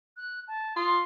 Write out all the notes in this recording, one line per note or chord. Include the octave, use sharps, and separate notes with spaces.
F#6
A5
F4 D#6